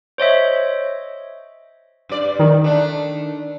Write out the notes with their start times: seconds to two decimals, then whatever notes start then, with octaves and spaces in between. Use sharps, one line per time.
0.18 C5 C#5 D#5 E5
2.09 G2 D5
2.39 D#3
2.64 A3 D4